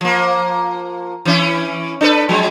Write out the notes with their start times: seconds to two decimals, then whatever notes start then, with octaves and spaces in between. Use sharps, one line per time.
0.01 F3 A#3
1.25 E3 C#4 E4
2.01 D4 A4 B4
2.29 F3 G#3